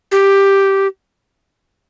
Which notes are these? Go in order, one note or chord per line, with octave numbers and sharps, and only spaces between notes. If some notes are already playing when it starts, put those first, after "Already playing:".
G4